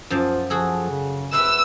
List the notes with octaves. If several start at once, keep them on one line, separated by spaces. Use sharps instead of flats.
F#2 F3 F4 A5
F3 F#4 G#4 A4
C#3
B4 E5 F#5 E6